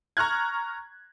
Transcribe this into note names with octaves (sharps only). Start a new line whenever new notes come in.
A#5 C#6 F6 F#6 G#6